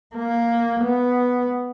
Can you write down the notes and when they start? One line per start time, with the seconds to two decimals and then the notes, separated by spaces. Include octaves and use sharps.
0.15 A#3
0.84 B3